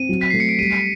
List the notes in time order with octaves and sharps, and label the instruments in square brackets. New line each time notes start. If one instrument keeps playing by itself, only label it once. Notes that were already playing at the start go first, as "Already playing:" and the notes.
Already playing: [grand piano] C4 [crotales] D#7
[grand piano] F#3
[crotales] B6
[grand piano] A3 [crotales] C7
[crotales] C#7
D7
[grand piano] G3 [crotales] D#7